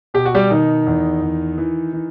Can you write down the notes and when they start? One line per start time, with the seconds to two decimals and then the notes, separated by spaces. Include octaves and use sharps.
0.14 B2 G4
0.25 F#4
0.35 G3 G4
0.50 B2 D#3 D#4
0.87 E2
1.22 E2
1.58 E3
1.93 E3